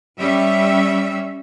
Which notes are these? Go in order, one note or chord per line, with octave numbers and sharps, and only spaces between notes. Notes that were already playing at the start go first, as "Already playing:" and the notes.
G3 C#4 E5